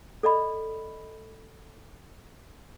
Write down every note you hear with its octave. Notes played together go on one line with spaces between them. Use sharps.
A4 D5 D#5 B5